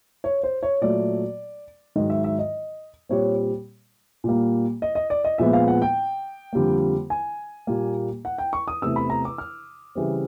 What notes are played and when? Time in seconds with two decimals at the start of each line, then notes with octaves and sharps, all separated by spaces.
0.24 C#5
0.43 C5
0.63 C#5
0.81 A#2 F#3 A3 D5
1.96 G#2 D#3 F#3 D#5
2.10 E5
2.24 E5
2.39 D#5
3.09 A#2 G3 C4 C#5
4.24 A#2 G3 A#3
4.82 D#5
4.95 D#5
5.10 D5
5.24 D#5
5.38 A#2 F3 G#3 B3 E5
5.53 F5
5.68 F#5
5.82 G5
6.53 F2 D3 G3 A#3
7.10 G#5
7.67 A#2 G3 A#3
8.25 F#5
8.38 G5
8.53 C#6
8.68 D#6
8.82 E2 C3 E3 A3 E6
8.96 B5
9.10 A#5
9.25 D6
9.38 F6
9.95 C#3 E3 G3 C4